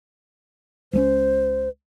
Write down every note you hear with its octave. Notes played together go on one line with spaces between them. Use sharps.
C#2 G#3 C#4 C5